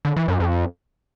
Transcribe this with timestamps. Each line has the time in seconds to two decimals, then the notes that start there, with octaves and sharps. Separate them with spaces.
0.05 D3
0.17 E3
0.28 F#2
0.40 F2